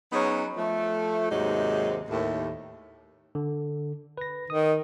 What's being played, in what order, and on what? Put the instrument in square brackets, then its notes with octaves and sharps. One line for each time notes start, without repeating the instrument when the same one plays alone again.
[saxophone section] F#3 B3 C#4 D#4 G#4
F3 A3
D#2 G#2 C3 F#3 D#4
D#2 A2
[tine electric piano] D3
B4 A#6
[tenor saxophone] D#3 [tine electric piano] D#6